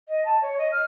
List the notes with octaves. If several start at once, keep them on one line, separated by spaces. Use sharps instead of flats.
D#5
A5
C#5
D#5
F6